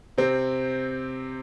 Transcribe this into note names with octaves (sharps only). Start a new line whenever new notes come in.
C3 C4